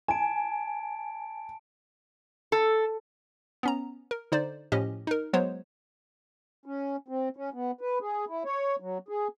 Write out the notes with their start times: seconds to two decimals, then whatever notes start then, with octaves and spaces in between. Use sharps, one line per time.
0.08 G#5 A5 D7
2.52 A4
3.63 B3 C#4 A#5
4.11 A#4
4.32 D3 D#4 C5 D5
4.72 A2 F3 C#4 G4 D#5
5.07 D#4 A#4
5.33 F#3 G#3 B3 C5 C#5
6.66 C#4
7.08 C4
7.36 C#4
7.53 B3
7.81 B4
8.01 G#4
8.28 E4
8.45 C#5
8.80 F#3
9.08 G#4